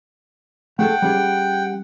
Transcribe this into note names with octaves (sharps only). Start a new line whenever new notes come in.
A3 G#4 A4 F#5 G5
G3 C#4 G#4